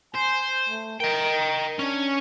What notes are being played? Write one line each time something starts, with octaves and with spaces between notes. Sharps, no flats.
C5 G#5
A3
A#4 D#5 G5
C#4 D4